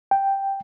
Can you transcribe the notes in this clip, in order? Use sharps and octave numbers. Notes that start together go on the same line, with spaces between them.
G5